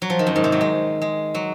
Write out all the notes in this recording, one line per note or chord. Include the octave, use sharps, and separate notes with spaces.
F#3
F3
D#3
F#2
G#2
C3
F#3
G#3
G#3
F#3